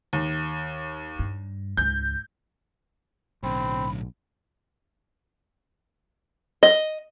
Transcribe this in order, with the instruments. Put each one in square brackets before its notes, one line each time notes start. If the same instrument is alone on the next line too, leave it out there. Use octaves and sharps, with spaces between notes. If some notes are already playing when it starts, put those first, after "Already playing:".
[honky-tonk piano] D#2
[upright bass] G2
[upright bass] C#2 G#2 [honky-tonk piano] G6
[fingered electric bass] B1 [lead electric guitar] A2 D3 [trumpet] C4 [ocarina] B5
[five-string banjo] D#5